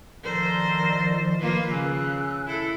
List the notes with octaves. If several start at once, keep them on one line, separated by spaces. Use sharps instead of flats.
D#3 F3 A4 A#4 C5 D5
A#3 F4 B4
C#3 G#5 E6 F#6
E4 A4